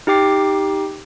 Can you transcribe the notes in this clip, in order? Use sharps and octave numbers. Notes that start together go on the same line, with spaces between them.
D#4 G4 G5 D6 C7